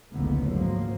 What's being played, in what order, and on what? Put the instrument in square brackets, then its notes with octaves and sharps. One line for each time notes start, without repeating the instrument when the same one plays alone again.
[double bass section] F1 C#2 A2 D3 A#3 B3
G#1 D2 F3 F#3 A#3